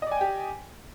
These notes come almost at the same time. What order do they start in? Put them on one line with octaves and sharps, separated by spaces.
D#5 D5 G#5 G5 G4